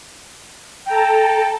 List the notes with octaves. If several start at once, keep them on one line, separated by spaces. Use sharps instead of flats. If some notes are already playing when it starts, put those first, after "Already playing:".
A4 G5 A5 A#5